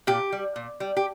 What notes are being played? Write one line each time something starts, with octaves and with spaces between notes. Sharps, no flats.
A#2 G4
G3
A#2
G3
G4